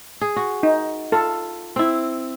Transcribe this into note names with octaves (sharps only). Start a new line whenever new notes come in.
G#4
F#4
D#4
F4 A4
C4 E4